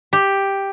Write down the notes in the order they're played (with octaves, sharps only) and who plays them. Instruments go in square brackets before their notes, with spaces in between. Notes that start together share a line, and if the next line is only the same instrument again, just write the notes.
[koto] G4